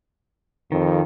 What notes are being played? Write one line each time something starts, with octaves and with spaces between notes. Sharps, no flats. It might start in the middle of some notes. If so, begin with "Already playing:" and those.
F2 D#3